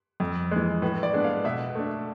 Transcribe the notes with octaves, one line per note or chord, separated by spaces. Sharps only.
F2
E3 G#3
A2 B4
D5
G#3 B3 D4
F5
B2 E5
A3 D4